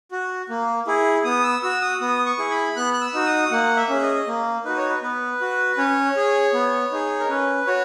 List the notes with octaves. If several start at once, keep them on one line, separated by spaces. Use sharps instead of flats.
F#4
A#3
E4 G#4
B3 D#6
E6
F#4 E6
D#6
B3 D#6
C#6
E4 G#4
B5
B3 F#6
F#6
E6
D#4 F#4
D#6
A#3 F#5
E5
C#4 G#4
D#5
A#3
D#4 F#4 B4
C#5
B4
B3 B4
F#4
C#4 C#5
G#4
B3
D#4 G#4
A#4
C#4 B4
F#4 C#5